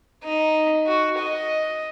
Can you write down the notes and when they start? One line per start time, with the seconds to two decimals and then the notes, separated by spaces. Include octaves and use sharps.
0.24 D#4
0.87 F#4
1.18 D#5